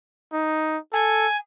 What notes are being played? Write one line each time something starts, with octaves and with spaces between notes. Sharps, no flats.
D#4
A4 G#5